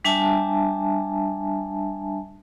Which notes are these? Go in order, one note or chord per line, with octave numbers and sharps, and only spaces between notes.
G3 D4 E5 G#5 A5